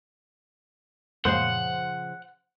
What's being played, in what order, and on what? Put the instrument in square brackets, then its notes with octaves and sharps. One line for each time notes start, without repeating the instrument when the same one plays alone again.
[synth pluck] F#2 A#2 G#3 [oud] C#3 F3 F5 [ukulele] C5 [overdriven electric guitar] F#5